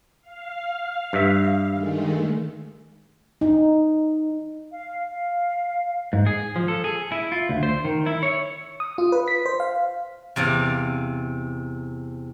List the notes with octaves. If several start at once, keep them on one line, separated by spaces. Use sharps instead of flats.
F5
G2 E5
D#3 G#3 A3
D#4
F5
F5
G#2
G#4
F3
A4
G#4
E4
F4
D2
C5
D#3
E4
C#5
D#6
F4
B4
B6
C5
F5
E2 C3 D5 F5